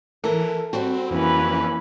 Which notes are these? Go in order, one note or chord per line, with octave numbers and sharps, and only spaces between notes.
E3 A4 A#4
G3 C4 F#4
F2 E3 A#3 C#4 B4